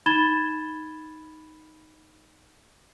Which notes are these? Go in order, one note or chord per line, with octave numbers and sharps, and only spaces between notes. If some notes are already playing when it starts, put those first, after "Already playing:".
D#4 B5 G#6 A6 E7 G7